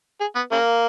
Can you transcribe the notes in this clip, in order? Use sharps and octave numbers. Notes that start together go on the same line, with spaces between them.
G#4
B3
C#3 A#3